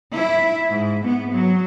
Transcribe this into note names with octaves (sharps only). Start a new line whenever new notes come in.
E4
G#2
B3
F#3